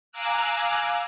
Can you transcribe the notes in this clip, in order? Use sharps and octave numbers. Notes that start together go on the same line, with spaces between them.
F5 G#5 A#5 D6 E6 F#6